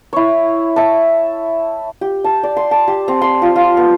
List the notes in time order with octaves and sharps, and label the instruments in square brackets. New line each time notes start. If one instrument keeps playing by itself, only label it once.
[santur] E4 C#5
E5 A5
G4
A5
D5
C6
A5
G4
C4
C6
F4
F4
B3